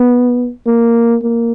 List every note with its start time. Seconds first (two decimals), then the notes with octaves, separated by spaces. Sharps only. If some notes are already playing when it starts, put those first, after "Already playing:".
Already playing: B3
0.67 A#3
1.23 A#3